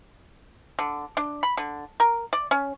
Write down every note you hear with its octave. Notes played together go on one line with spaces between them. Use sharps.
D3
D4
B5
D3
A#4
D5
C#4